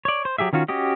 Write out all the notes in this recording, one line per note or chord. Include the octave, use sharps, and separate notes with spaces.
C#5 D5
C5
F#3 G4 G#4 E5
D#3 C#4 F4 F#4
C#4 F#4 G4 D#5